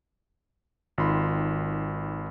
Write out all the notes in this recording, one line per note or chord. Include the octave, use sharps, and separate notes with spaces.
G#1 D#3 F4 B5 C6